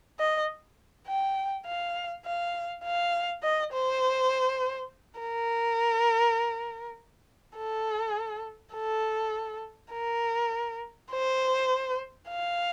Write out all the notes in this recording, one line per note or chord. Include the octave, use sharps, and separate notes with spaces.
D#5
G5
F5
F5
F5
D#5
C5
A#4
A4
A4
A#4
C5
F5